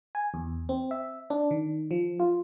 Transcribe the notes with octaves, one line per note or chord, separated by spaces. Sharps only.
G#5
E2
C4
E5
D4
D#3
F3
F4